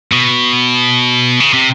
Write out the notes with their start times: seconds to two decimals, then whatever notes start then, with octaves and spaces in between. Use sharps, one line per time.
0.12 B2
1.40 C#3
1.53 C3